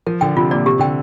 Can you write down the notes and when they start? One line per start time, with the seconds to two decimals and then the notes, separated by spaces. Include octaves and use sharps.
0.07 F3 A#4
0.21 D3 G5
0.36 C3 F4
0.51 A#2 D5
0.66 C3 G4
0.79 D3 G5